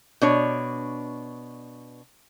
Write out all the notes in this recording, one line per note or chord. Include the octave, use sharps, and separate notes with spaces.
B2 D4 C#5